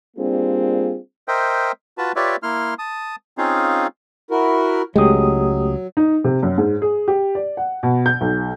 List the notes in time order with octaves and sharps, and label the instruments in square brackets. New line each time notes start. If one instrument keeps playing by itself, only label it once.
[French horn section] G3 A#3 C4 D4 F4 G#4
[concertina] A#4 C5 D#5 E5 G5
F4 F#4 B4 A5
F4 G4 B4 C#5 D5 E5
A#3 E4 C6 F6
A5 D#6
C4 C#4 D#4 F4 G#4 F5
[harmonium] E4 F#4 A#4
[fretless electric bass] C#2 G#3 [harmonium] F#3 [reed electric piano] A3 G4 D#6
[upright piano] D#4
C3
F#2
G#2
G#4
G4
D5
F#5
B2
G6
B1